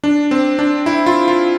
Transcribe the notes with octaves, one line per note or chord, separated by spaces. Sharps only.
D4
C4
D4
E4
F4
F4